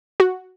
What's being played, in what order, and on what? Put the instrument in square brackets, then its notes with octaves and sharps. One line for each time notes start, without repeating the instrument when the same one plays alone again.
[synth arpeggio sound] F#4